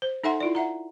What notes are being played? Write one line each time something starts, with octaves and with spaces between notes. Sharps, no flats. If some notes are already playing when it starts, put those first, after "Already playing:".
C5
D#4 A4 E5 F#5 G#5 C6
E4 F4 D5
E5 F#5 A#5